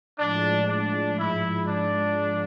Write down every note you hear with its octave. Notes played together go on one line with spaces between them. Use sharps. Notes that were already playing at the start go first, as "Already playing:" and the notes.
A2 F3 G#3 D4
D4
G#2 F3 G#3 E4
D4